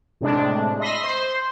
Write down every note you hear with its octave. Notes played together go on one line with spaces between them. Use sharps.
A2 C3 G#3 D4
D#5 E5 B5 C6 A#6
C5 C6